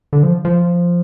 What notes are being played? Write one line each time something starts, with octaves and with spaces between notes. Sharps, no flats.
D3
F3
F3